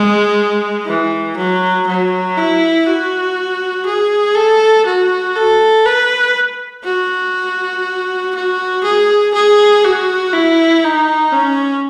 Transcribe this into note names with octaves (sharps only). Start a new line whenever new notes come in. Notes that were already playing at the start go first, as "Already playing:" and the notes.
Already playing: G#3
E3
F#3
F#3
E4
F#4
G#4
A4
F#4
A4
B4
F#4
F#4
G#4
G#4
F#4
E4
D#4
C#4